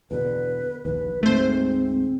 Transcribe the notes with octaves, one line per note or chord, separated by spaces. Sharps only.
E2 B2 D3 B4
A#1 D#2 B4
D2 G#2 A3 C4 C5